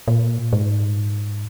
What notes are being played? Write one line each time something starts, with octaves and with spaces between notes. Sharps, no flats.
A#2
G#2